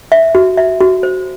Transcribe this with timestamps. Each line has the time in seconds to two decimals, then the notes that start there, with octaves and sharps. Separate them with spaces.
0.12 E5
0.35 F#4
0.57 E5
0.80 F#4
1.03 C5